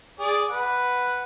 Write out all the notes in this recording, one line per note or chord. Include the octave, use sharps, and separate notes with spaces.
G#4 D5
B4 F#5